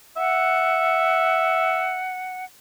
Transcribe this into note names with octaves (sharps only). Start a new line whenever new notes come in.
E5 F#5